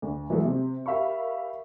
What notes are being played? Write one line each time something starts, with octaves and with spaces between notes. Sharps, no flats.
D2
E3 F#3 G#3 A3
C3
G4 A#4 E5 F5 B5 C#6